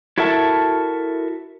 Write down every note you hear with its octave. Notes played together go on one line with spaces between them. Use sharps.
E4 F#4 A4 A#4 E5 A5